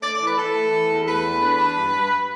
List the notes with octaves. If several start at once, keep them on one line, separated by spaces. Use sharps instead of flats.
A3 D5
D5
E3
B4
E3 A4
A3
E3
E2
A3 B4
E2
D4
D4
G2
G2